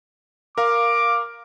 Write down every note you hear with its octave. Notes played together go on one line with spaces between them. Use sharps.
A#4 F5 D6